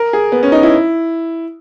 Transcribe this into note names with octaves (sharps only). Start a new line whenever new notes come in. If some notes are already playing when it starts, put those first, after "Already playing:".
Already playing: A#4
G#4
B3
C#4
D#4
E4